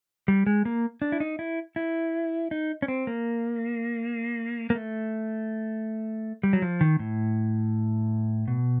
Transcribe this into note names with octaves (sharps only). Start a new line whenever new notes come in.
G3
G#3
A#3
D4
E4
D#4
E4
E4
D#4
C#4
C4
A#3
A#3
A3
G3
F#3
F3
D#3
A2
B2